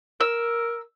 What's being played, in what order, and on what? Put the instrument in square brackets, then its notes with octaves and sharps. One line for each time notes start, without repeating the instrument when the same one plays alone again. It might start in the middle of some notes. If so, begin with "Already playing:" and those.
[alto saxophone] A#4 [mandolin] E6